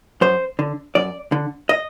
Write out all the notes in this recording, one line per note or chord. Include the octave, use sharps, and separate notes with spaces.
F#2 C5
D3
F#2 D5
D3
D#5